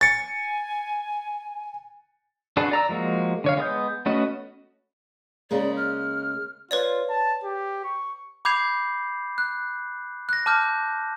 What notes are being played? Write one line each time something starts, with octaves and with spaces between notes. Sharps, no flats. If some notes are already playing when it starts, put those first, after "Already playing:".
G#5 A6 C#7
D4 F#4 G#4 A4 B4
D5 A#5 E6
F3 G#3 A#3 F#4
D3 C#5 F5
G#3 B3 D#6 G6
A3 B3 C#4 F#4 D#5
C#3 G#3 A#3 D5
F6
F4 B4 C#5 D5
A5
G4
C#6
B5 D6 G6 G#6 C7 F7
F#6
F#6 A#6
A5 D6 F6 G6